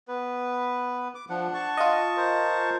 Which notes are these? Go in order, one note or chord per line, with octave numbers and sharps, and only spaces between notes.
B3 B4
D6
F3 D4 F#5
A5 C#6
F4 D#5
A#4 C5